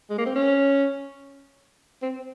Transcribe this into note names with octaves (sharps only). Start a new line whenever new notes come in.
G#3
A#3
C4
C#4
C4